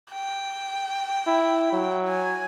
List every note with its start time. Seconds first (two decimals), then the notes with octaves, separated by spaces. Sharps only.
0.11 G5
1.27 E4
1.72 F#3
2.09 G#5